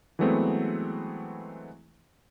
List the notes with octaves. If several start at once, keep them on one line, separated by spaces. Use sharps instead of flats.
E3 F#3 G#3 A3 B3 C4